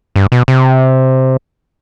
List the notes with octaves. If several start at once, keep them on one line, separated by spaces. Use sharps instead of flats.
G2
B2
C3